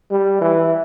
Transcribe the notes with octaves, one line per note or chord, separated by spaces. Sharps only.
G3
E3